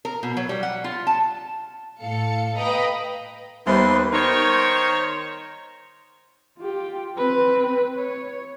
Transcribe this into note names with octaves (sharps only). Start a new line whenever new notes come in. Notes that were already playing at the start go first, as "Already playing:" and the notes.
A#4
B2
F#3
G3
F#5
F4
A5
A2 A4 F5 C#7
B4 D#5 F5 G5 A#5 B5
D#2 G3 B3 B4 C5 C6
D#3 D#4 A#4 C5 C#5
F4 G4
C4 B4
C#5